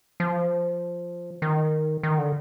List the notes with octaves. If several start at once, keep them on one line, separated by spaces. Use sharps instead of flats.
F3
D#3
D#3
D3